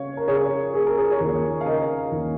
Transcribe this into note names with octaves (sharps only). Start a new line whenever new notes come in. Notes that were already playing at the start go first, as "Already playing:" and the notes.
Already playing: C#3 C#5 F5
A#4
C#3 G#4 C#5
A#3 G#4
A#4
G#4
C#5
D#2 A#4
F5
C#3 A#4 D#5
D#2